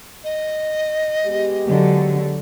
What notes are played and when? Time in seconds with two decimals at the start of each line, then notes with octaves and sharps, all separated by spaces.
0.24 D#5
1.26 G#3 B3 G4
1.68 D3 F#3